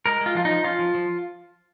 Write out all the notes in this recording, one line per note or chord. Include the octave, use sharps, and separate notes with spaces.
G#3 A#4
G#3 F4
F3 F4
D#4
F3
C#4 F4
F3
F3